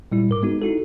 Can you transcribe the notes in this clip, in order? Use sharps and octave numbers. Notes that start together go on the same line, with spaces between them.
A#2 G3 E4
G#2 A#4 D6
G#3 B3 D#4 F#4
D#4 E4 F#4 A4